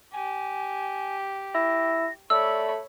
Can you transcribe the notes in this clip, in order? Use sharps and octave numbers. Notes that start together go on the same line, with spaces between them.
G4 G#5
E4 A#6
A3 C#5 D5 B5 E6